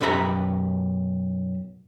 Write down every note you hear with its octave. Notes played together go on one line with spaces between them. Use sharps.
B1 F#2 G4 B4 E5 A#5